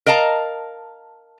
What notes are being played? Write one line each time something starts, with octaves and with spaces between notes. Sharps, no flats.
A#4 D#5 F5 A5 A#5